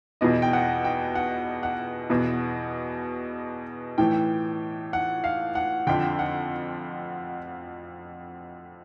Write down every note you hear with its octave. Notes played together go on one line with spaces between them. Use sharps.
E2 B2 D#5
G5
F#5
G5
F#5
F#5
E2 B2
A2 E3 G5
F#5
F5
F#5
F2 D3 G5
F#5